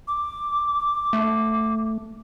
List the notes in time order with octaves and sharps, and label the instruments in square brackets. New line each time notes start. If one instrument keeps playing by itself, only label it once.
[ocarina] D6
[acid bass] A3